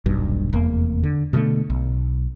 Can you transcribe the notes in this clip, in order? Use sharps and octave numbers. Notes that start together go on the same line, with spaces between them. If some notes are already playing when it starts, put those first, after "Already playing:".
D#1 B1 G2
F1 E2 A#3
D3
B2 D3 G#3 A3
B1